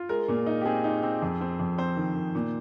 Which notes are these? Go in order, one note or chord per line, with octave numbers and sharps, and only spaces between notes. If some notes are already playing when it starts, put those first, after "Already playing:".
Already playing: F4
G#3 A#4
A#2
D#4
G4
C4 G#4
D#4
C4
F2
C4
F2
C4 C5
D#3
D#3
A#2